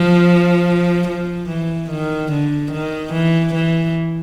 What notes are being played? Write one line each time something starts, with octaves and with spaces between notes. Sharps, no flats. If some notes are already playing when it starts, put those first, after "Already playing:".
Already playing: F3
F3
E3
D#3
D3
D#3
E3
E3